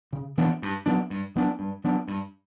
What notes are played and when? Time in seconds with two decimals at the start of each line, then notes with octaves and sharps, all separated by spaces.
0.13 C#3
0.38 E3 B3 D4
0.62 G2
0.86 F#3 B3 D4
1.10 G2
1.35 F#3 B3 D4
1.59 G2
1.84 F#3 B3 D4
2.08 G2